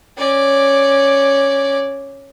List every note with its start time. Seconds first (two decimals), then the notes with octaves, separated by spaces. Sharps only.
0.18 C#4 D5